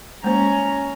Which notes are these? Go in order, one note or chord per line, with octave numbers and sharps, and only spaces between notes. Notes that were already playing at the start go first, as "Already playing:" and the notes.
G#3 A#3 C#4 C5 A#5